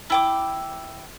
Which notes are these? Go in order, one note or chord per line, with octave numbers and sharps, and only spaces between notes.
E4 G5 D6